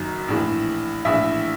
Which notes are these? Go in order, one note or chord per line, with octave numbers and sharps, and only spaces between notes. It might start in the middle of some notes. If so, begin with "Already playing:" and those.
Already playing: F#1 F#2 D#3 F#3
A#1 A2 E3
A#1 A2 E3 E5